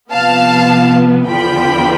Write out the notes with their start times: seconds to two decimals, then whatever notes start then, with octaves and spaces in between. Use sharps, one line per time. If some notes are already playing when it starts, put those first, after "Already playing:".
0.11 C3 F3 B3 F5 A5
1.27 E2 D3 F3 G5 B5